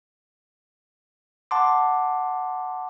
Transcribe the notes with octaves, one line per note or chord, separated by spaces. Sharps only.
F#5 A5 C6 D6